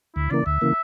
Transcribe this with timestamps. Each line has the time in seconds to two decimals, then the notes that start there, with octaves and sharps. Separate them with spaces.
0.15 D2 E4
0.31 C#3 E3 A#3 D5
0.46 D2 E5
0.61 C#3 E3 A#3